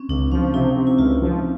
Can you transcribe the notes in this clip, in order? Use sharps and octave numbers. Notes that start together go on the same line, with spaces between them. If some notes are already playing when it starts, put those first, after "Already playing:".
Already playing: C4 C#4
C#2 D4
F3 C#4
C3 D#4
C3
E4
C#2 F4
F3